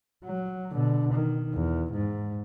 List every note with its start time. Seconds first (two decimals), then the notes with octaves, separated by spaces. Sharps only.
0.25 F#3
0.72 B2 D3
1.13 D#3
1.53 E2
1.92 G#2